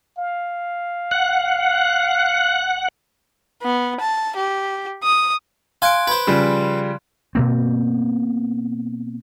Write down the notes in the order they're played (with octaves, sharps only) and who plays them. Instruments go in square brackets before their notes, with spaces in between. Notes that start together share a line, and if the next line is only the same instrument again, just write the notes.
[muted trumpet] F5
[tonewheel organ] F#5
[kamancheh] B3
A5
G4
D#6
[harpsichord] F5 G#5 [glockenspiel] C6 F#6 D7
[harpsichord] B4 C5 [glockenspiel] G#6
[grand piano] C#3 F3 G3
[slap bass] B2 A#3 C4